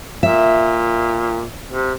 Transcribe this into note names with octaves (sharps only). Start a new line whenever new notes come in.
A#2 E5
C3